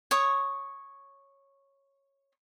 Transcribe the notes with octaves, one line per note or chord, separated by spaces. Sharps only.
C#5 C#6 D#6